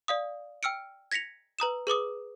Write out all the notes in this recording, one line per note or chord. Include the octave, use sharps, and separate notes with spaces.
D5 F5 D#6
G5 E6 F6 C#7 D7
G#6 A#6 B6 C#7 F7
B4 A#5 D#6 E7
G#4 B4 D6 D#6